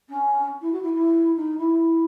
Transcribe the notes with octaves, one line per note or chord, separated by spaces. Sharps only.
C#4
E4
F#4
E4
E4
D#4
E4